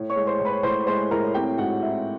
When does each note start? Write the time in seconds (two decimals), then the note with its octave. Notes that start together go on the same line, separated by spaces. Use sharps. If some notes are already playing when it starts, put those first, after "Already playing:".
Already playing: A2
0.10 C#5 C#6
0.16 G#3
0.27 C5 C6
0.40 A2
0.45 B4 B5
0.63 A2 C5 C6
0.87 G#3 C5 C6
1.11 A2 A#4 A#5
1.34 C4 G4 G5
1.57 G#2 F#4 F#5
1.82 C4 E4 E5